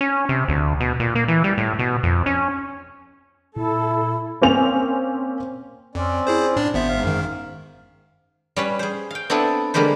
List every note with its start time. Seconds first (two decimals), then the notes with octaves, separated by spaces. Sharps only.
0.01 C#4
0.29 C3
0.48 D2
0.80 B2
1.00 A#2
1.15 A#3
1.28 E3
1.44 G3
1.58 A2
1.79 B2
2.03 F2
2.26 C#4
3.56 A#2 E4 A4
4.42 A#3 C4 C#4 F7
5.95 F2 C4 C#4 D5
6.27 E4 G#4 C5
6.56 A2 D4 D5
6.74 G#1 B3 C5 E5
6.88 G#2 F5
7.03 F#2 D#3
8.56 G3 C#4 B4
8.79 G#4 C5
9.11 F5 G5
9.30 B3 C4 D4 E4 A4
9.74 D3 G3 G#3 A#3 B4 C5